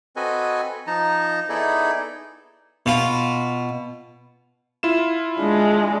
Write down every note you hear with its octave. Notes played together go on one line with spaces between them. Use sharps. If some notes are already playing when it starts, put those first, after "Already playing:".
C4 F#4 A4 B4 D#5 G#5
F3 D#4 A5 A#5
B3 D#4 E4 G#4 A4 D5
B2 F4
E4 F4 E7
G#3 D4